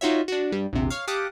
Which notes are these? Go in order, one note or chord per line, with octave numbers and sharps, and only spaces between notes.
D#4 F4 F#4 C#5 E5
D4 F#4
G2 G3
A#1 E2 C3
C#5 F5
G4 F5 F#5 A5 D6 D#6